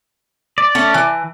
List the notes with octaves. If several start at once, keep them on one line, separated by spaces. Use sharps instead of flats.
D5
A3 C#4
E3